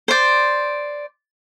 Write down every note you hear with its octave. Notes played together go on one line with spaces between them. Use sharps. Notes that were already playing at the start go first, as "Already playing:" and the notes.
C5 D5